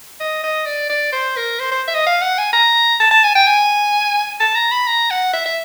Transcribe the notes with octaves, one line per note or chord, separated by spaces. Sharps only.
D#5
D#5
D5
D5
C5
A#4
C5
C5
E5
D#5
F5
F#5
G#5
A#5
A5
A5
G#5
G5
G#5
A5
A#5
B5
A#5
F#5
E5
E5